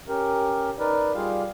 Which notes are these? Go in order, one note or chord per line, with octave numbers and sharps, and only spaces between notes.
C#4 G4 A#4
D#4 A#4 B4 D5
G3 F4 G4 G#4 F5